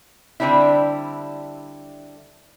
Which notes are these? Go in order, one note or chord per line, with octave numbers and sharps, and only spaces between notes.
D3 G3 C4 D4 E4